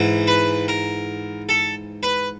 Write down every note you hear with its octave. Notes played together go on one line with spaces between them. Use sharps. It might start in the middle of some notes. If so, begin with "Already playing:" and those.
Already playing: G#2 E3
B4
A#4
A4
B4